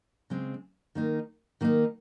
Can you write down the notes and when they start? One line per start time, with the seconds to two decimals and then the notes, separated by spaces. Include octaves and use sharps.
0.30 C#3 G#3 C4
0.95 D#3 A#3 D#4
1.61 D#3 A#3 D#4